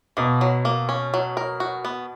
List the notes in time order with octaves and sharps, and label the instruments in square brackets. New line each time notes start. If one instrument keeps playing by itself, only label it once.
[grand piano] B2 [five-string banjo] A#3
[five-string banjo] F#3
A#3
C#4
F#3
A#4
F#4
B3